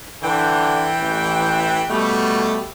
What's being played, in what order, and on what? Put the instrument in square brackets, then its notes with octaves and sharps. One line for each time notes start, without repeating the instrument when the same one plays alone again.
[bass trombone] D3 [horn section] E3 G5
[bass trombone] A1
[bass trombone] B2 [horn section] G3 A3